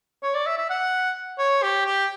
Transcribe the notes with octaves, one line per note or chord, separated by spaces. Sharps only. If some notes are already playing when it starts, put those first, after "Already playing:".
C#5
D5
E5
E5
F#5
C#5
G4
G4